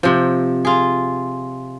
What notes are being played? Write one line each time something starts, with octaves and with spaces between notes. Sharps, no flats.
C3 F3
F4 G#4